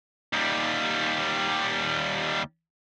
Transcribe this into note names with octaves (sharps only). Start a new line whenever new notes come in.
D#2 G3